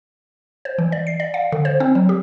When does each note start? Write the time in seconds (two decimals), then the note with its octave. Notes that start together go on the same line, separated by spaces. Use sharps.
0.65 C5
0.78 E3
0.92 D5
1.07 C7
1.20 D5
1.34 F5
1.52 D3
1.65 C5
1.80 C4
1.95 F#3
2.09 G4